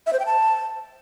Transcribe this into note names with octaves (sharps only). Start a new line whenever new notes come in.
E5
C5
G5
A5